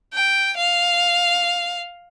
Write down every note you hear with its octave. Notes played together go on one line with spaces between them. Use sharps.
G5
F5